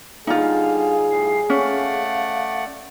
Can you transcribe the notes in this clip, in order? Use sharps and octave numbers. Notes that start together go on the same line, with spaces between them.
D3 G3 D#4 F4 G#4 F5
A2 G3 C7
A3 C#4 D5 F5 F#5